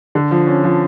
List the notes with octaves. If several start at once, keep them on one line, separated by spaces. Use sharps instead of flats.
D3
F3
C#4
F3